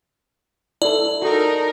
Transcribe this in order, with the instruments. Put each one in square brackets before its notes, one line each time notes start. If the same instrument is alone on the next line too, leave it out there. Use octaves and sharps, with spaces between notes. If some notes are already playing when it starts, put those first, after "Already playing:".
[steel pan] E4 A4 [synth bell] D5
[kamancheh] D#4 A#4 [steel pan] F#4 A4